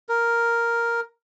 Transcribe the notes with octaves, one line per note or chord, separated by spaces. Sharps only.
A#4